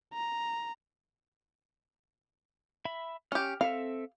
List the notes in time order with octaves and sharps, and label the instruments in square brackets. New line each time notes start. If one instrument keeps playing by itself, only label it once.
[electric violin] A#5
[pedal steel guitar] E5 B5
[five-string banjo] C#4 G4 [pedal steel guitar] F6
[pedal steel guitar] C4 A4 E5 [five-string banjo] F5